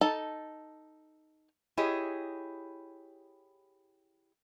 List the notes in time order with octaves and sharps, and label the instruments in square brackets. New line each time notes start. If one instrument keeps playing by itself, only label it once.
[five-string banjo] D#4 A4 A5
[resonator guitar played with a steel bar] E4 G4 G#4 C#5 D#5